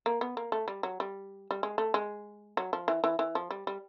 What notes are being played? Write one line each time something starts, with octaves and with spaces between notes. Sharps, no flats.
A#3
B3
A#3
A3
G3
F#3
G3
G3
G#3
A3
G#3
F#3
F3
E3
E3
E3
F3
G3
G3